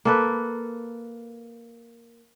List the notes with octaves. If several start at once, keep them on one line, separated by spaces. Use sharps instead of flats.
A#3 A4 B4